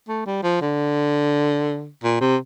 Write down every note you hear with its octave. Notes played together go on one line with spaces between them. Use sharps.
A3
G3
F3
D3
A#2
C3